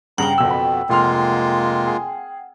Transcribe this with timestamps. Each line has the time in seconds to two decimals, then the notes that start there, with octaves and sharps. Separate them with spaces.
0.18 G2 C#3 F#5 G5 A#5
0.38 F#1 F2 B2 E6
0.50 B5
0.89 F1 G#3 A#3 F4 C6 F6
1.87 G#4